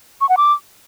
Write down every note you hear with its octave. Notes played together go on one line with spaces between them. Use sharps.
C#6
F#5
D6